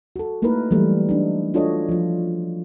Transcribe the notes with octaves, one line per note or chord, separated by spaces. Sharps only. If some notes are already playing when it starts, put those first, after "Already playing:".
F#4 A4
A3 A#3 D#4 E4 A#4 B4
E3 F#3 G3 A3
F#3 D4 D#4
D4 F4 F#4 A4 C#5 D#5
F3 F4